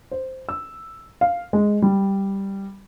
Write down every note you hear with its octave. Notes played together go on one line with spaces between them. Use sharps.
C5
E6
F5
G#3
G3